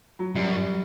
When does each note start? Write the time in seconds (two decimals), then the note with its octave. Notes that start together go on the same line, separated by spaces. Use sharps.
0.19 F#3
0.35 F#2 G3
0.51 G3